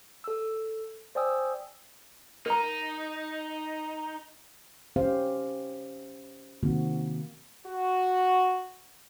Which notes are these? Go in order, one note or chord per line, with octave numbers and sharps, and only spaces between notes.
A4 E6
C5 D5 G5 G#5 D#6 E6
D#4 A#4 A#5
C#4 G4 C5 F5
C3 D#3 A#3 C4 F#4
F#4